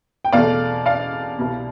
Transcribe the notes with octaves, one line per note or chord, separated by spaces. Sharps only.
G5
E2 B2 A3 D5 F5
D5 F5
C2 B2 G3